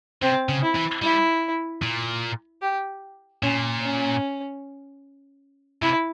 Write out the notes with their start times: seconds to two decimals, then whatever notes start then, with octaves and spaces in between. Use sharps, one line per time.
0.22 C3 C4
0.49 C#3
0.63 E4
0.76 E3
1.02 G3 E4
1.82 A#2
2.62 G4
3.43 A#2 C#4
3.82 C#4
5.82 C3 E4